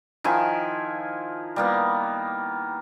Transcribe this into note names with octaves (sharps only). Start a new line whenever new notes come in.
D#3 F3 E4 G#5
G3 A#3 B3